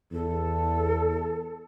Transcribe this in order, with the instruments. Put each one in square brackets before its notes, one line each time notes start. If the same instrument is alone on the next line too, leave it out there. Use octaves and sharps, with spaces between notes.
[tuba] E2 [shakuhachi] A4